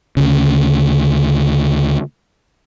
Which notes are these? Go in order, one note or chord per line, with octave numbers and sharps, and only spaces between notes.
D2 C#3